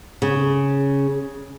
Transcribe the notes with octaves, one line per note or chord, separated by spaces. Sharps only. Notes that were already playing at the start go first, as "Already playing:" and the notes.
C#3